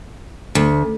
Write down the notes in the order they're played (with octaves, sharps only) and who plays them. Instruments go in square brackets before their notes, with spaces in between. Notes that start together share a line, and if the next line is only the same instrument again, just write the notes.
[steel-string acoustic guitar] D2